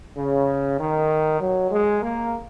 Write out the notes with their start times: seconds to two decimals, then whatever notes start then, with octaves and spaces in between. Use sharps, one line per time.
0.17 C#3
0.79 D#3
1.41 F#3
1.71 G#3
2.03 A#3